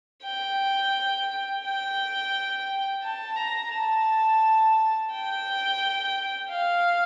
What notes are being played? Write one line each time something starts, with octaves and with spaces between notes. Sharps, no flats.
G5
G5
A5
A#5
A5
G5
F5